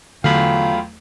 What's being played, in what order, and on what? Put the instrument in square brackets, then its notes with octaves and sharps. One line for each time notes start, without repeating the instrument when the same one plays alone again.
[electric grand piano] E2 F#3 A3 [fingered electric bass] D3 [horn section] F4 G5 [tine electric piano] F5 B5